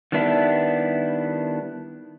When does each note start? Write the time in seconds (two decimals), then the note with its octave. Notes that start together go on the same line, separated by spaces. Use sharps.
0.12 D#3 G3 B3 D4 E4